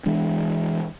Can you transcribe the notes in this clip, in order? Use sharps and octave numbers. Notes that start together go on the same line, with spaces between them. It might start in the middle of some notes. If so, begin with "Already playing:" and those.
E3 G#3 D4